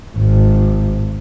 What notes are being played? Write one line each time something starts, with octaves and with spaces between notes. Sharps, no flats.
G#1